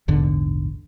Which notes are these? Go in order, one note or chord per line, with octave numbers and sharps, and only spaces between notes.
A#1 E2 G#2 D3